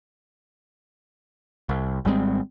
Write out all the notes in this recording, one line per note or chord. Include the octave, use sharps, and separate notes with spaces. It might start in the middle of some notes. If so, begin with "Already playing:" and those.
C2
G#1 G3 G#3 C4